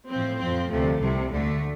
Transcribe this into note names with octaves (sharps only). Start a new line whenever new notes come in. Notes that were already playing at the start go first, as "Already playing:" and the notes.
A2 F3 C4
F2 F3 C4
D2 C3 F3 A3
C2 C3 G3
D2 D3 A3